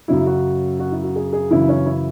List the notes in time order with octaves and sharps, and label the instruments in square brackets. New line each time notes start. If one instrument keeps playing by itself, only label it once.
[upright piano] F#2 C#3 F#3 E4
F#4
F#4
E4
F#4
G#4
G#4
F#2 C#3 E3 E4
C#4
E4